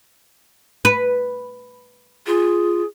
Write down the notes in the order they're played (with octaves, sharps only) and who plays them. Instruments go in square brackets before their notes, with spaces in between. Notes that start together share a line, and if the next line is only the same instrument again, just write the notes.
[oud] B4
[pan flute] F4 [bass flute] G#4